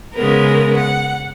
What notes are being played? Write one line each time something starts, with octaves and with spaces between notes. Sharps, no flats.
C#3 G#3 B3 A#4
F#5